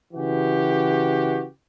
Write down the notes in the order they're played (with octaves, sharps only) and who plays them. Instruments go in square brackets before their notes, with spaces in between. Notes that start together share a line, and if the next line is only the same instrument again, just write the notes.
[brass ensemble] C#3 E3 F#4 G4